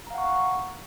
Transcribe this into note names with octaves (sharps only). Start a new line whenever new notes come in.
F5 F#5 A#5 C#6